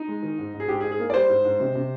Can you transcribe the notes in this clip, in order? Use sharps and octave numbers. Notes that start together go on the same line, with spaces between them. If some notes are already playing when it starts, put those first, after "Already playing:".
Already playing: D#4
G#3
D#3
G#2
G#2
G#4
G#2 G4
G#4
G#2
G#4
A#3
D5
G3 C5
G#2
G#2
C3
C3